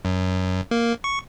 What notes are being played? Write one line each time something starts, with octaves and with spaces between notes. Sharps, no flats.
F#2
A#3
C#6